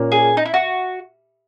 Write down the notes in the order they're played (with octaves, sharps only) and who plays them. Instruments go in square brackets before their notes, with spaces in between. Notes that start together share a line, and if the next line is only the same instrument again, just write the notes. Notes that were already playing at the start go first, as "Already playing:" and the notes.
Already playing: [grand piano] A#2 A#3 C#4
[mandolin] G#4
D#4
E4
F#4